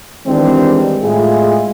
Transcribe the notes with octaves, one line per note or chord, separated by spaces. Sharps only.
D#3 E3 G3 G#3 C4 D4
A2 G#3 E4 F4 G#4